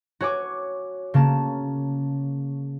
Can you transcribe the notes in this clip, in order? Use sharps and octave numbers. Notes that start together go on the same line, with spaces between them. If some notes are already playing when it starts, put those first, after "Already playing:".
F#4 C#5 G#5 D6
C#3 A#3 A5